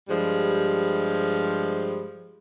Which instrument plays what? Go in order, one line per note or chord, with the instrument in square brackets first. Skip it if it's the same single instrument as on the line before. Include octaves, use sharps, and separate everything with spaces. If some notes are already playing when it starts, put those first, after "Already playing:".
[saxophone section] G2 F3 G3 G#3